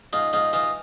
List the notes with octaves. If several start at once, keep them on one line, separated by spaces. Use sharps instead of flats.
G#2 D#4 F4
G#2 D#4 F4
E3 D#4 F4